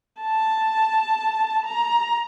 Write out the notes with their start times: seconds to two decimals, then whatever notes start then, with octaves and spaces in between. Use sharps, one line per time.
0.22 A5
1.65 A#5